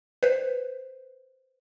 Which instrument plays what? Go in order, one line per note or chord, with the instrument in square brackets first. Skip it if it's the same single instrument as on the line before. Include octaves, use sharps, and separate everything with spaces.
[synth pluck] B4 C5